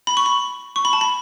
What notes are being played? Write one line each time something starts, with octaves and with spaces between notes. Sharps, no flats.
B5
C#6
B5
C#6
B5
A5
B5